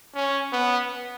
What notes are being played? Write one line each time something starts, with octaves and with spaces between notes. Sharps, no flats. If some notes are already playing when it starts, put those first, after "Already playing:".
C#4
B3